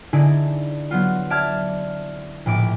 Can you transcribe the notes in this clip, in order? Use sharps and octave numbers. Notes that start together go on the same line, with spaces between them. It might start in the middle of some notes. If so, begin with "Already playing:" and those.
D3 D#4 E4 G#4 A4 D5
F#3 B3 F4
D5 E5 A5 F6 G#6
A#1 A2 D6 D7